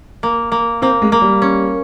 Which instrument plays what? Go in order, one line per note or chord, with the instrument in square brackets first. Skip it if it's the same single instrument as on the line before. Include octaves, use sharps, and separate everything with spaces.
[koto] A#3
A#3
[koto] A#3 [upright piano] C4
[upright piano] G#3
[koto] A#3
[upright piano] G3
[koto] C#4